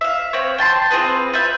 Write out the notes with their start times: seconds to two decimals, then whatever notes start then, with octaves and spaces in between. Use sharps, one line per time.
0.01 E5 F5
0.33 C4 C#5
0.58 G5 A5 B5 C6
0.90 C4 F4 G#4 B4
1.33 F4 B4 E5 G6